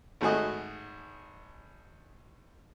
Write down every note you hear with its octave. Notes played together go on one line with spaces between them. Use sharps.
G#1 A3 F#4 G#4 D#5